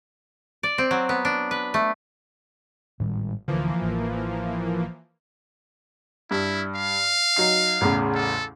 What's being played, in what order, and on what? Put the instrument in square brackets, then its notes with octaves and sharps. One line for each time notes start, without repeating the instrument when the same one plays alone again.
[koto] D5
C4
F#3
B3
D4
B4
A3
[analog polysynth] G#1 [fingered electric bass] A2 D#3 G3
[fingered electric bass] D1 D3 [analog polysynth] E3 F3 A#3
[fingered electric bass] A1
[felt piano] G2 [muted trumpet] E4
[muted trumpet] F5
[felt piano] F#3 D#4 C7
A1 E2 C#3
[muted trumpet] A4